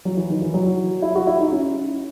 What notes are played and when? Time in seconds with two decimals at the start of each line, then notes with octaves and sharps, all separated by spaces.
0.05 F#3
0.17 E3
0.30 D#3
0.42 E3
0.54 F#3
1.02 E4
1.15 F#4
1.27 E4
1.40 D#4
1.52 C#4